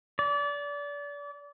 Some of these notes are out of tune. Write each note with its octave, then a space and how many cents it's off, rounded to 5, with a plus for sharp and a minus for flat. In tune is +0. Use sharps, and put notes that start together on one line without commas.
D5 -30